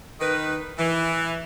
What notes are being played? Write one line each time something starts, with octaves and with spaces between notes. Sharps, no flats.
D#3 B4
E3